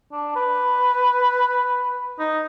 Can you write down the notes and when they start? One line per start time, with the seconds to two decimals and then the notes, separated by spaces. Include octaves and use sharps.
0.12 D4
0.36 B4
2.19 D#4